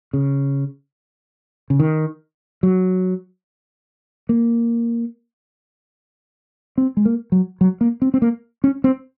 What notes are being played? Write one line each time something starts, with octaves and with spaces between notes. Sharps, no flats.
C#3
C#3
D#3
F#3
A#3
C4
G#3
A#3
F#3
F#3
A#3
C4
C4
A#3
C#4
C4